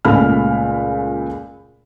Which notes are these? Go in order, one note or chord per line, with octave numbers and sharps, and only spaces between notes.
C#2 A#2 G#3 A3 B5 F6